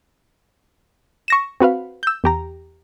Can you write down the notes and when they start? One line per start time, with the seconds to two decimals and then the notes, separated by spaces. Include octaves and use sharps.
1.28 C#6 A#6 E7
1.60 C4 F#4 B4 F5
2.03 E6 G6
2.24 E2 G4 A#5